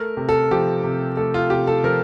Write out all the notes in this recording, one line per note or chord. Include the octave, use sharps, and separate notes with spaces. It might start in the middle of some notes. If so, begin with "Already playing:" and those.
Already playing: A3 A#4
C3
A4
F3 G4
C3
A3 A4
F4
C3 G4
A4
F3 A#4